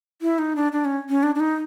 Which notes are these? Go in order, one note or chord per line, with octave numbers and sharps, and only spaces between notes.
E4
D#4
D4
D4
C#4
C#4
D4
D4
D#4